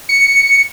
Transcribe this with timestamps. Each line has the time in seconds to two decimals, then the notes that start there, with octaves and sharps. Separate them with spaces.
0.09 C#7